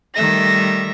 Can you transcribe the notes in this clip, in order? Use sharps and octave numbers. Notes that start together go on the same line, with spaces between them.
D#3 G3 A3 E5 A#6